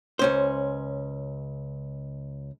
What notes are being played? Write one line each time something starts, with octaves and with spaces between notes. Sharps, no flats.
C#2 C#4 C5